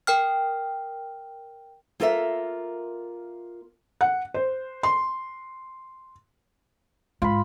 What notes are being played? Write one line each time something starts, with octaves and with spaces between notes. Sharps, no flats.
A#4 G5 F6
A#3 F4 A4 A#4 D5 E5
F#5
C5
C6
G#2 F4 B5